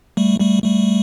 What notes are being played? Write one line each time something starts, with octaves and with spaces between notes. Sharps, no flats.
G3 A3
G3 A3
G3 A3